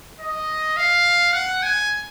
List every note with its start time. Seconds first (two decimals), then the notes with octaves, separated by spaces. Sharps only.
0.20 D#5
0.77 F5
1.33 F#5
1.63 G#5